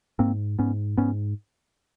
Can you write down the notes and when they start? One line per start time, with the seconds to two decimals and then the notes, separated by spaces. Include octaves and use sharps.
0.19 G#2 A#3 C4
0.59 G#2 B3 C#4
0.97 G#2 B3 C#4